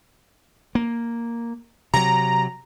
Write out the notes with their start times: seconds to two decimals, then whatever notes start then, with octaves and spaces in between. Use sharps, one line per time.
0.75 A#3
1.94 C3 F#3 A#5